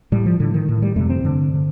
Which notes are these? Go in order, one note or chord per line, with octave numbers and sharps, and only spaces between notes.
A2 G3
F3
A2 D3
D#3
A2
G3
F2 C3 A3
C4
G2 D3
D3